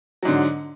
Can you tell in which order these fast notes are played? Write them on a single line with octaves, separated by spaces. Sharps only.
F#3 G#2 D3